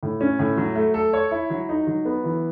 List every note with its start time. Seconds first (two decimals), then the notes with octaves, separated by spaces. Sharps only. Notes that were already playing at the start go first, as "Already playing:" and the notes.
0.03 A2
0.21 C#4
0.39 A2
0.58 F#3
0.75 A3
0.94 A4
1.13 C#5
1.31 E4
1.50 F#3
1.69 D#4
1.87 F#3
2.05 B3
2.24 E3